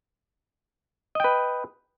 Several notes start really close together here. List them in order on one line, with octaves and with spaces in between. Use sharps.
D#5 G5 B4